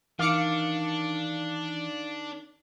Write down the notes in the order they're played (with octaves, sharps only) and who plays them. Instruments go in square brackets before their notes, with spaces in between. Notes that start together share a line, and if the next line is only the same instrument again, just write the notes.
[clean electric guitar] D#3 [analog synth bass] E3 [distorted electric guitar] D4 [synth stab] F5 D6 C#7